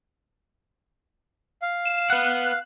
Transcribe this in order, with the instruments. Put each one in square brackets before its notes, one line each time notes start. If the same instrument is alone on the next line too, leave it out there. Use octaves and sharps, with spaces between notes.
[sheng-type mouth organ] F5
[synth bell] E7
[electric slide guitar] B4 F#5 [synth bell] F#6